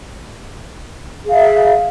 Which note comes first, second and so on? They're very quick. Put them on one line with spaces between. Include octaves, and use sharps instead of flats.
G#4 F5 E5